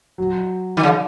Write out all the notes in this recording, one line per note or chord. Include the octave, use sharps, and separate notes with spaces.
F#3
D#3
C#3